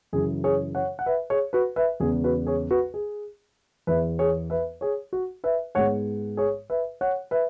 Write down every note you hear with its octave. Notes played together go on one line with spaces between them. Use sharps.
F#2 C#3 E3 G#4
G#4 C#5
C#5 F#5
F#5
B4 E5
G#4 C#5
F#4 B4
B4 E5
E2 C#3 G#3 B3 G#4
F#4 B4
G#4 C#5
F#4 B4
G#4
E2 E3 B3 B4 E5
G#4 C#5
B4 E5
G#4 C#5
F#4
B4 E5
G#2 G#3 B3 C#5 F#5
G#4 C#5
B4 E5
C#5 F#5
B4 E5